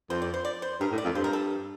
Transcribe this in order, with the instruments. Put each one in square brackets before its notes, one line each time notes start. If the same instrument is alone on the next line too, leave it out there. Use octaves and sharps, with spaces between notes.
[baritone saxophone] F2 [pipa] C5
[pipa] D5
C5
D5
C5
[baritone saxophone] G2 [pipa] A#4
[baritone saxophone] A2
[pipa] D5
[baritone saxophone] F2
[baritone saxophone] G2 [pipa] C5
[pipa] A#4
A4